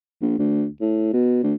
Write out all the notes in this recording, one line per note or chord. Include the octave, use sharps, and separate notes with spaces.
A#1
D2
A2
B2
D2